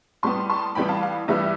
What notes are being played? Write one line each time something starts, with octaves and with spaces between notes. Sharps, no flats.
A2 G3 B3 A5 C6
A5 C6
A2 E3 G3 B3 G5 B5
F5 A5
F5
G2 E3 G3 B3 E5